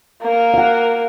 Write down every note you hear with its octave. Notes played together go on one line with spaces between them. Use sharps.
A#3 A#4
F5 F#5